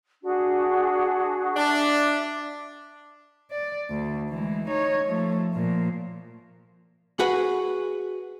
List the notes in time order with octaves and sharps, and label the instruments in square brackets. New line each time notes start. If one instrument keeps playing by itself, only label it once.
[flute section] D4 F#4 G#4
[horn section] D4 [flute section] E5 D6
[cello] D5
D2
E3 G#3
D#4 C#5
F3 A3
A#2 F3
[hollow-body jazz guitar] F#4 G#4 B4 F#5